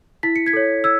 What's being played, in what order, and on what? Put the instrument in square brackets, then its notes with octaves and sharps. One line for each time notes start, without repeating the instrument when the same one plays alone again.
[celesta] E4 B6
C#7
G#6 B6
A4 C#5
E6 G#6